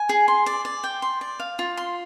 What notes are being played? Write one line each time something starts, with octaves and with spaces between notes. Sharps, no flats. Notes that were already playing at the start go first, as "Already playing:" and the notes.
Already playing: G#5
G#4
C6
D5
D5
G5
C6
D5
F5
F4
C6